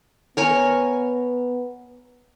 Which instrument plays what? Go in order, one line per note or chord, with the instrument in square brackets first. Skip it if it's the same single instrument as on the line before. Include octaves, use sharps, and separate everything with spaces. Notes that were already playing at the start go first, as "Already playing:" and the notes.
[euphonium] B3 [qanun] A#4 C#5 G#5